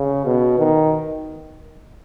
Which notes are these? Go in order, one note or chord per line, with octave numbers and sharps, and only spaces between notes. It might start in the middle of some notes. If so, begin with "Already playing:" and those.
Already playing: C#3
B2
D#3